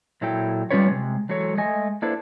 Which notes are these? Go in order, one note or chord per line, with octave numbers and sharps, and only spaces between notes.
A#2 F#3 E4 A4 G5
G3 A3 C#4 F4 B4 C#5
C3 G#3
E3 F#3 G#3 A4 C#5
G#3 A3 D#5 G#5
A#3 D4 E4 A4 B4 C5